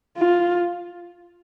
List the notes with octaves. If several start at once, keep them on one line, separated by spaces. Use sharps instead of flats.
F4